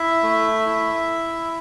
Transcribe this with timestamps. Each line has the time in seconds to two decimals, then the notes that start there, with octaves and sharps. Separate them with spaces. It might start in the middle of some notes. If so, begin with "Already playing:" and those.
Already playing: E4 E5
0.22 A3
0.66 E4